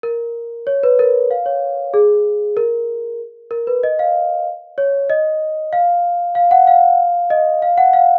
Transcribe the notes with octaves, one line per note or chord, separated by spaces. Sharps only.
A#4
C#5
B4
A#4
F5
C#5
G#4
A#4
A#4
B4
D#5
F5
C#5
D#5
F5
F5
F#5
F5
D#5
F5
F#5
F5